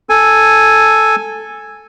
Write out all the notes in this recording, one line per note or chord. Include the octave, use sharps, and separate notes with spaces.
A4 G#5